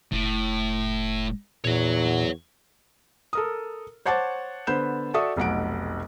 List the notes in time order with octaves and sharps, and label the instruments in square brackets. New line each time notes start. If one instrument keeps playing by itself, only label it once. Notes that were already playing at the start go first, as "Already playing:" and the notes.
[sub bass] F1 [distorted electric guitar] A2
[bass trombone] E2 [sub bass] A#2 [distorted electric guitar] C#5 F#5
[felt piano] A4 A#4 D#6
C5 C#5 F#5 A5 D6 A6
D3 B3 C5 B5 G6 E7
F#4 A4 D5 E5 C#6 D#6
F1 B1 F#5 D7